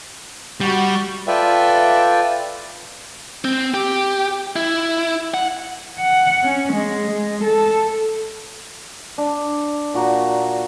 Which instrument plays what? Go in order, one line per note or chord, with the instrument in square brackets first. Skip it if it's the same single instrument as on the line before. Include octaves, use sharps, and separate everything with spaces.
[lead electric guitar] G3 [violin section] F#4
[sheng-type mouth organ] F4 A4 B4 D5 E5 G5
[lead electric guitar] C4
G4
E4
F#5
[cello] F#5
C#4
G#3
G#3
A4
[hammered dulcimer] D4
A#2 F#4 A#5